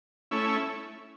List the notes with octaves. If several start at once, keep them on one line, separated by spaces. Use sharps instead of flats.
A3 C#4 E4